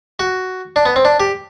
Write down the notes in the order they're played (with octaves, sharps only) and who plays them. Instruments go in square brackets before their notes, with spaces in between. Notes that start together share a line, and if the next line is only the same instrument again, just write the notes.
[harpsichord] F#4
D4
B3
C4
D4
G4